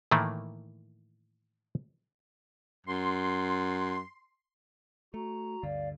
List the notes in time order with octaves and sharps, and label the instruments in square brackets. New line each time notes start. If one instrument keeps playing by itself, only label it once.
[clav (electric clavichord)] A2 D#3 E3 A3 A#3
[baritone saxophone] F#2 [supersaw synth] C6
[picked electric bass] A3 [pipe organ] F#4 A#5
[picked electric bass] D2 G2 D3 [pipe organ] D5 F5